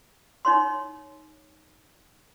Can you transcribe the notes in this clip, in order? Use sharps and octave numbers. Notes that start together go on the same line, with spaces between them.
D#4 C#5 C6